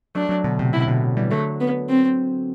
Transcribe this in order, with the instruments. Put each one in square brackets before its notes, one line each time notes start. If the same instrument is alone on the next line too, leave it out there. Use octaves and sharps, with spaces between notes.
[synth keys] F#3 A3 [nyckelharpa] D4
[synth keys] F#3 A3
B2 D3
A2 C3
[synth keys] A2 C3 [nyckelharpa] E4
[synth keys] B2 D3
E3 G3
[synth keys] D3 F#3 [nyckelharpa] A3
[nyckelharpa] B3
C4